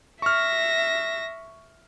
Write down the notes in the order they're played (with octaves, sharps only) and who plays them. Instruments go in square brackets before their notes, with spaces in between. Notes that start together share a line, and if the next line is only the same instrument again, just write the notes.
[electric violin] E5 A#6 [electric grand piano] C#6 F6